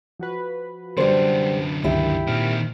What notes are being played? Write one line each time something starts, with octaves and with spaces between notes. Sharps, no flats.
F3 F#4 B4
F#2 D3 G3 C5
C#2 G2 D#3 E4 G4
A#2 D#3 C4 F6